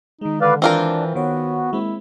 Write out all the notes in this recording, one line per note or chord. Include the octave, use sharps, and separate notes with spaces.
D#3 G#3 D#4
D3 B4 D5 F5
E3 C4 D4 F4 A#4
D#3 B3 F#4 C#5
G#3 A#3 C4 E4